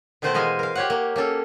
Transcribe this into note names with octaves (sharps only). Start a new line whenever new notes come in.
B2 D#3 A3 C5 F#5 A5
E3 G#3 D#5 F5 G#5
A#4 F5
G4 C#5 F#5
A#3
A#3 C#4 A4